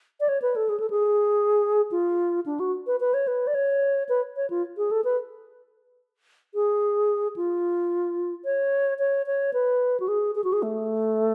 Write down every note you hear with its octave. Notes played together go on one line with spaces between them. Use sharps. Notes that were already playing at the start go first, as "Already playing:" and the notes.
D5
C#5
B4
A4
G#4
A4
G#4
F4
D4
F#4
B4
B4
C#5
B4
D5
C#5
B4
C#5
F4
G#4
A4
B4
G#4
F4
C#5
C#5
C#5
B4
F#4
G#4
G#4
F#4
G#4
A3